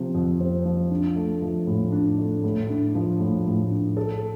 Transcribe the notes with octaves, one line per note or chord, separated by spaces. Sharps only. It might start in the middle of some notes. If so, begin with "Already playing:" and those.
Already playing: C3 F3 C4
F2
C4
F3
D4
A3
F3
A2
D4
A3
A2
D4
F3
A2
A2
D4
A4